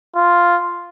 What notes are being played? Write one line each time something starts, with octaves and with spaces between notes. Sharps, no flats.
F4